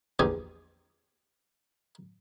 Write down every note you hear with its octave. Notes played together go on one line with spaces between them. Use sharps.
A#1 E2 G4 G#4 G#5